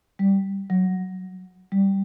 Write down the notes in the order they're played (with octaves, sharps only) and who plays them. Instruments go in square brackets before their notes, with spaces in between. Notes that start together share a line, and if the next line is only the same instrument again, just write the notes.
[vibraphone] G3
F#3
G3